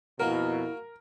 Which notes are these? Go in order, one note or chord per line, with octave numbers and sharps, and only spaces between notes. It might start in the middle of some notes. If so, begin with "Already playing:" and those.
F2 B2 A#3 E4 F#4 A#4